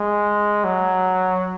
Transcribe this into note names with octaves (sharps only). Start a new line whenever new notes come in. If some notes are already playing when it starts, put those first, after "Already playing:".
Already playing: G#3
F#3